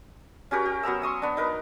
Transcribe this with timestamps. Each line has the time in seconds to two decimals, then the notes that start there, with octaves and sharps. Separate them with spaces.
0.51 C#4 F#4 G4 A#4
0.66 G4
0.83 F#3 B3 A#5 E6
1.02 C6 C#6 D#6 E6
1.22 B3 D4
1.37 D#4 A#4 B4